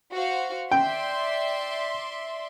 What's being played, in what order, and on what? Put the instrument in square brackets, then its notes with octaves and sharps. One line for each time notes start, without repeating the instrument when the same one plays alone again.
[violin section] F#4 C5 F5
[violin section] D5 E5 C6 [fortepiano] G5